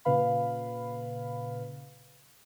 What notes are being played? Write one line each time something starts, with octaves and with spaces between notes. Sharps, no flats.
A#2 C#3 B4 F5 B5